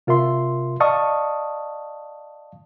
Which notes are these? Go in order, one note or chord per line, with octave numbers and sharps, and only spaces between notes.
C3 F4 A#4 E5 C6
D5 D#5 F5 A5 C#6 D#6